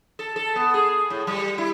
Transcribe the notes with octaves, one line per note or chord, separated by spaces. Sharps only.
A4
A4
B3
G#4
A2
G3
E4